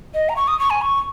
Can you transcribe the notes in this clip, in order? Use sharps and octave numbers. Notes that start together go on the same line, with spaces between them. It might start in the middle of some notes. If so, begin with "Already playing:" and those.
D#5
A#5
C#6
D#6
C#6
G#5
C#6